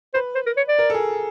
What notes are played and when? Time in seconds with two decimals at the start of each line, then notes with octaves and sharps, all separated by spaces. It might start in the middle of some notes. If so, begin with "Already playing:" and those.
0.14 B4 C5
0.35 C5
0.46 A#4
0.57 C#5
0.68 D5
0.79 A#4
0.90 A4
0.94 G#4